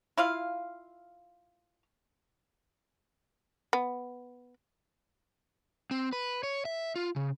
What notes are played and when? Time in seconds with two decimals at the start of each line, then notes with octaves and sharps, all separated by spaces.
0.17 E4 F4 F5
3.73 B3
5.91 C4
6.13 B4
6.43 C#5
6.65 E5
6.96 F4
7.16 C#3